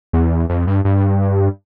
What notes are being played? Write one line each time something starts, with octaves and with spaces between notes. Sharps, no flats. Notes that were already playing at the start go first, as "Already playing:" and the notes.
E2
F2
G2
G2